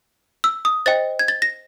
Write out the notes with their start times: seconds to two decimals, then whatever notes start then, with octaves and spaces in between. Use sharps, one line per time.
0.44 E6
0.65 D#6
0.86 C5 D#5 G5 A6
1.19 G#6
1.28 A6
1.42 A#6